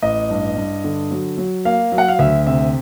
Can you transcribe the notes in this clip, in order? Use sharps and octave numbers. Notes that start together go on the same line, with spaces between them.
A1 D#5
G2
G2
D3
F#3
F#3
A#3 F5
F#3
F#5
F5
D2 E5
C3 E5